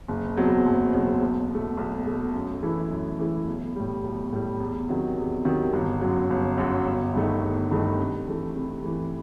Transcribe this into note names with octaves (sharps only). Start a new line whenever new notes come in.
F#1
E2 B2 F#3 C4
F#1
E2 B2 F#3 C4
B1
B2 A3
B1
B2 A3
F#2
E3 A3 E4 A4
F#2
E3 A3 E4 A4
B1
A2 G3
B1
A2 G3
E2
C3 D#3 F#3
E2
C3 D#3 F#3
G1
F#2 F#3
G1
F#2 F#3
G1
G2 D#3 A3 D#4
G1
G2 D#3 A3 D#4
C3
E3 A3
C3
E3 A3